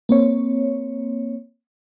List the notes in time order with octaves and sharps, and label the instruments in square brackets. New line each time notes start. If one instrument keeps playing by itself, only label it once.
[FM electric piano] A#3 C4 C#5